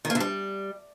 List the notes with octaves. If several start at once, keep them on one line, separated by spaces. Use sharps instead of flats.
D#3
A#3
D3
G3